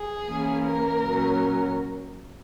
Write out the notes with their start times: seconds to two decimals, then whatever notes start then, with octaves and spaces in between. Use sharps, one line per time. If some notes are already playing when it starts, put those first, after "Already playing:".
Already playing: G#4
0.26 E3 A#3 C#4
0.65 A#4
1.02 A#2 F#3 C#4